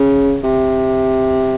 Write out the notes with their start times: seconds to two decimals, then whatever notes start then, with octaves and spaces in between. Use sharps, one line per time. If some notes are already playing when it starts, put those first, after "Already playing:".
Already playing: C#3
0.44 C3